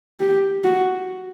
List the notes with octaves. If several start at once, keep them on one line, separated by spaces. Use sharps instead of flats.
G4
F#4